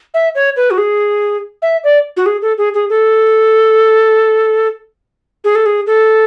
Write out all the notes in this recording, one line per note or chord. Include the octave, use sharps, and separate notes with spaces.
E5
C#5
B4
F#4
G#4
E5
D5
F#4
G#4
A4
G#4
G#4
A4
G#4
A4
G#4
A4